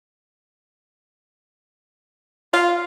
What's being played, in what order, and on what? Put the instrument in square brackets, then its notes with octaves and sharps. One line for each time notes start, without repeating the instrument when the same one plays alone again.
[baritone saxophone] F4 [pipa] F5